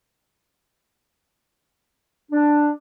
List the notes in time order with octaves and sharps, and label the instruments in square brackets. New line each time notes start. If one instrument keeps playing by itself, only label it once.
[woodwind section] D4